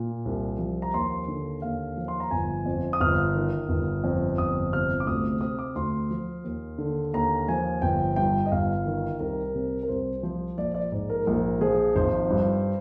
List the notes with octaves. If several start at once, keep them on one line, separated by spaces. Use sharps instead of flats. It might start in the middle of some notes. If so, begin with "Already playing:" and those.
Already playing: A#2
C2
F3
A#5
D#2 C6
D3
D#2 F5
F3
C6
A#5
G1 G#5
F2
D#6
G1 F6
D#3
G1
F2
G1 D#6
C3 F6
D6
D2 D#6
C3 D#6
D6
D2 C6
F3
D#2
D3
D#2 A#5
F3 G#5
G1 G5
G2 G5
D#5
G1 F5
D#3
C2 A#4
C3
A#4
C2 C5
F3 C5
A#1 D5
D5
G#2
A#4
A#1 A#4
F3 G#4
G#1 C5
G2